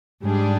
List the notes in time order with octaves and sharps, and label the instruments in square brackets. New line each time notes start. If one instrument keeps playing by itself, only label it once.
[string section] G#2 G3 D4 G#4